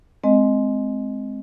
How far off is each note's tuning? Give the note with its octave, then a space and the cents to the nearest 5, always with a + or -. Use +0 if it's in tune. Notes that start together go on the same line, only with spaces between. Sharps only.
G#3 +20 C4 -5 D#5 +0